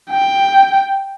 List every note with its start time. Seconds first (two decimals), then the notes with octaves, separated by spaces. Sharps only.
0.11 G5